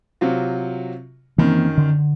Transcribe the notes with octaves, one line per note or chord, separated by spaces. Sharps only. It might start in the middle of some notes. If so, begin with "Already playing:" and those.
C3 F#3 F4
F#2 D#3 E3 A#3 C4
D3